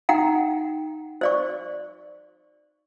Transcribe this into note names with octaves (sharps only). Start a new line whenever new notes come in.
D#4 F#5 G5 A#5
C5 D5 C#6